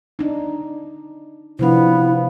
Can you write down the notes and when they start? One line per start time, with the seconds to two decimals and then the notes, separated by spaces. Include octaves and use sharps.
0.19 D4 D#4
1.59 C3 F3 B3 D4 E4 C5 F5